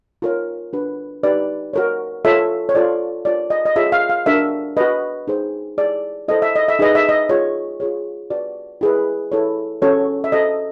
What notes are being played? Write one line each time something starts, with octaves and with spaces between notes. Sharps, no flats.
F4 A#4 C#5
D4 F#4 B4
D#4 G4 B4 D5
F#4 A#4 C#5
F4 A4 C#5 E5
C#5
F4 A4 C5 D5
F4 A#4 C#5 D5
D#5
D#5
F4 G#4 C#5 E5
F5
F5
D4 F#4 A#4 E5
F#4 B4 D#5
D#4 G#4 C5
E4 G#4 C#5 D5
E4 A4 C5 D#5
E5
D#5
E5
D#4 G#4 B4 D#5
E5
D#5
F4 G#4 C#5
F4 G#4 C#5
F#4 B4 D5
E4 G#4 B4
E4 A4 C#5
C#4 F#4 A4 C#5
E5
F#4 A4 C5 D#5